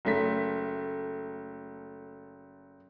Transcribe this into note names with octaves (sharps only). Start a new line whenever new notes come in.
F#1 A3 B6